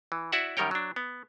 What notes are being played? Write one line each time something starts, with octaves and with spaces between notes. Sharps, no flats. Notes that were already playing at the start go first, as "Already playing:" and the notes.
E3
E4 F#4 D5 E5 F#5
F#2 D#3 G3 A#4 C#5 G5
F#3 D4
B3